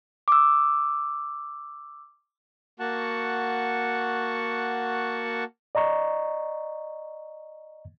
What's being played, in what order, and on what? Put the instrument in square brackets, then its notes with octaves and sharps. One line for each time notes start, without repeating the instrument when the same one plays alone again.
[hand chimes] D6 E6
[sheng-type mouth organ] A#3 F#4 F#5 A5 C#6
[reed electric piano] D5 D#5 A#5 C#6